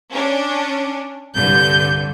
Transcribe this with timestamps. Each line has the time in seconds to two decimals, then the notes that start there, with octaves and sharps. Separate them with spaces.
0.11 C#4 D4
1.35 C2 G2 D3 G6